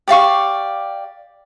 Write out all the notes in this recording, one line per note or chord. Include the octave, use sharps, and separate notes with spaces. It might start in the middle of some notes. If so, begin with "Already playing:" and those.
G4 D5 F5 C#6